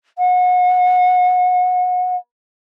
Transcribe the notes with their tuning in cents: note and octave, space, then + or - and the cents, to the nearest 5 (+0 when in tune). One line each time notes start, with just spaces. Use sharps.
F#5 -30